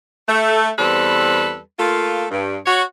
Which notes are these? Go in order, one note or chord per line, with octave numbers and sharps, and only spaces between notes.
A3
E2 G3 C4 A4 B4
A3 A#3 F4
G2
F#4 C#5